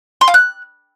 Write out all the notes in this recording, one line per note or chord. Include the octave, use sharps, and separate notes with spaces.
C6
F5
F#6